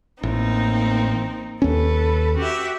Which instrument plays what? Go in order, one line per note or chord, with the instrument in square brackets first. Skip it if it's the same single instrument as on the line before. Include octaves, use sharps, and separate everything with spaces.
[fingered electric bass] A1 [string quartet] A#3 C4 D#4
[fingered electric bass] D#2 C#4 [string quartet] A4 B4
[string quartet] F#4 G4 E5